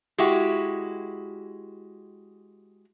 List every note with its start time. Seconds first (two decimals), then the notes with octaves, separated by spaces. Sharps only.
0.18 G#3 E4 F#4 G4